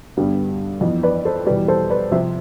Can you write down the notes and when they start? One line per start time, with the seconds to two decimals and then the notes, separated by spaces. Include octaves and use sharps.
0.17 G2 D3 G3 B3
0.81 F2 E3 B3
1.03 B4 D5
1.25 A4 C5
1.46 E2 B2 G3 B4 D5
1.68 A4 C5
1.90 B4 D5
2.11 C3 F3 C4 C5 E5